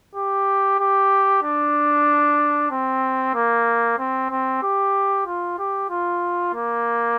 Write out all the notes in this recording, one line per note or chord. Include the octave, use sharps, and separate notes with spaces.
G4
G4
D4
C4
A#3
C4
C4
G4
F4
G4
F4
A#3